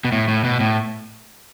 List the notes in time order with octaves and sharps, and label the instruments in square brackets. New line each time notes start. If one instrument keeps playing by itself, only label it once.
[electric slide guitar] B2
A2
A2
B2
A2